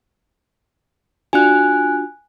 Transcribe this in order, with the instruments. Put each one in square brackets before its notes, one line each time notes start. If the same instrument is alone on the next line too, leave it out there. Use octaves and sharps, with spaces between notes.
[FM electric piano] D4 F4 F#4 [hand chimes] G#5 F#6